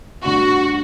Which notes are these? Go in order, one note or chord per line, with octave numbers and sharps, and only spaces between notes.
G2 D3 A3 D4 F#4